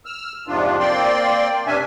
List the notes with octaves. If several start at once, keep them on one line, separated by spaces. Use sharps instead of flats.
E6 F6
F2 G#2 C3 F3 D4 F4
A#3 C4 D5 G5 C6
G2 C3 C#4 D4 E5 G#5